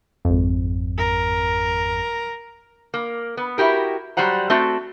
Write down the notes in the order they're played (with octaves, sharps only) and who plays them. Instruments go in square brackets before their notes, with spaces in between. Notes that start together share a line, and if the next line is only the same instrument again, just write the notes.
[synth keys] G#1 F2
[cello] A#4
[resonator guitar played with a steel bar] A#3
B3
E4 F#4 G4 A#4
F#3 G3 C5 F#5 A#5
A3 C4 F#4 A4